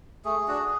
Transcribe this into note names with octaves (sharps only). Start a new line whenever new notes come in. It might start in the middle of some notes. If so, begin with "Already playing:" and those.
A3 G#4
D4 F#4